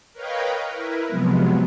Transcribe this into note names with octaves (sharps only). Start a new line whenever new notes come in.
A#4 B4 C#5 D#5 F5 G5
E4 A#4 B4
C3 F3 F#3 G#3 B3